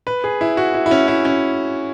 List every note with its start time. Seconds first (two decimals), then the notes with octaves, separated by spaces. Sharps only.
0.07 B4
0.24 G#4
0.41 E4
0.57 F#4
0.74 E4
0.86 E4
0.91 C#4
1.08 E4
1.25 C#4